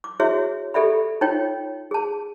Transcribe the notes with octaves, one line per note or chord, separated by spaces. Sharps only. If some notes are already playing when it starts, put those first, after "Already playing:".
D6
E4 F#4 G#4 C#5 E5
G4 A4 D5 E5 B5
D#4 F4 C#5 G5
G#4 A5